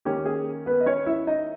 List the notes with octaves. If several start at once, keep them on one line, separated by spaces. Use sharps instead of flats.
D#3 A#3 C#4 G4
G#4
B3 B4
D#5
C#4 C#5
E4 E5
D#4 D#5